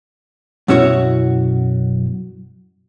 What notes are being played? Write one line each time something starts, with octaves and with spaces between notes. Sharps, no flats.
F#2 B2 C#4 E4 F#4 C#5